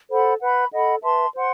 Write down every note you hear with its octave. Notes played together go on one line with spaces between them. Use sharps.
A4 C5 F#5 B5
B4 F#5 B5
A4 D#5 F#5 B5
B4 E5 A5 C6
C5 F#5 C6